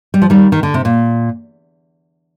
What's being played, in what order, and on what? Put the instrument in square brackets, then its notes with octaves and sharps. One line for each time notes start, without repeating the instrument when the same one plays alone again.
[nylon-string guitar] G3
F3
D#3 G3
D#3
D3
C3
A#2